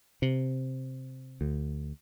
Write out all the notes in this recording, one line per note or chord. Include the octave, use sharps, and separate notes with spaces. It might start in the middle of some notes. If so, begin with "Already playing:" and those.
C3
D2